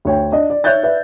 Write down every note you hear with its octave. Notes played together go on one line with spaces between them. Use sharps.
D2 C#5 G5
D4 D#5
D5
C#5 E5 F#6 G6 A6
B4 D5 E5